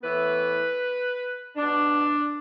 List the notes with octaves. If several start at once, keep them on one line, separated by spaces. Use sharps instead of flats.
A2 E3 B3 B4
B2 B3 D4